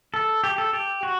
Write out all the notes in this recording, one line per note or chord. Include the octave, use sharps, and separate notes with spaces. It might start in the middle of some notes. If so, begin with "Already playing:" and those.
A4
G4
A4
G4
F#4